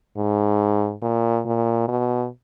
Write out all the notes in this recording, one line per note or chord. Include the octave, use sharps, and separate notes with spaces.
G#2
A#2
A#2
B2